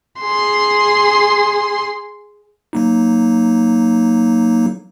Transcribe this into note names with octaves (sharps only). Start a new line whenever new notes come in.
G#4 C6
F#3 A#3 D#4